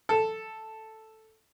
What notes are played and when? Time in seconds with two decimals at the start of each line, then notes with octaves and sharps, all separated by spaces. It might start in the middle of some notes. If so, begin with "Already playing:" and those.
0.09 A4